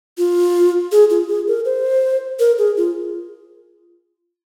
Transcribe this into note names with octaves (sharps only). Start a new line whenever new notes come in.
F4
G#4
F4
G#4
A#4
C5
A#4
G#4
F4